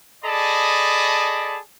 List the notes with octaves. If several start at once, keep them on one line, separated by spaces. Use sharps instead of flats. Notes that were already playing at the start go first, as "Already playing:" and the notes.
G#4 A4 D5 D#5 A5 B5